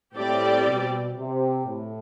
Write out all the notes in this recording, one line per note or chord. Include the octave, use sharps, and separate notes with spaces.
A2 G3 C4 G4 D5
B2
C3
A2